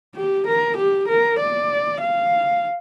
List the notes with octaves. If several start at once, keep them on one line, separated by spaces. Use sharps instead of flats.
G4
A#4
G4
A#4
D5
F5